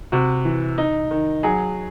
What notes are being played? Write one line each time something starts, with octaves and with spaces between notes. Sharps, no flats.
C3 F#4
E3
D#4
D#3
F#3 G#4